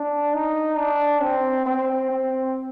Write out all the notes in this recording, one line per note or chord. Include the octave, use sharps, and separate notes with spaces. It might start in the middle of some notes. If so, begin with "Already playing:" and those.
Already playing: D4
D#4
D4
C4
C4
C4